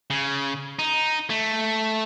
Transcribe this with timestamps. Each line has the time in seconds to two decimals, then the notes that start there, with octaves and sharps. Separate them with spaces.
0.10 C#3
0.79 D#4
1.30 A3